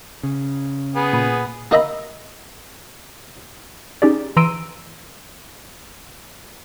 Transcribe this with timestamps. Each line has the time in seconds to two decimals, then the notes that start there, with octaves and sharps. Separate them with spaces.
0.23 C#3
0.95 B3 G#4
1.13 A#2 B5
1.71 A#3 D#4 D#5 E5 A#5 B5
4.02 C#4 D#4 G4 G#4 D5
4.37 E3 A#5 C6 E6 D7 D#7